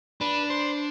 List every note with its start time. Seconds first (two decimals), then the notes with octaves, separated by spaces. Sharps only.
0.21 D4 B4
0.50 C5